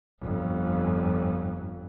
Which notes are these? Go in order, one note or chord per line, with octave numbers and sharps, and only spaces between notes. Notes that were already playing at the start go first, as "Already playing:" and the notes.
G1 F2